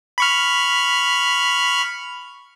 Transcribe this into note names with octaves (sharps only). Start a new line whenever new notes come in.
B5 C#6 F6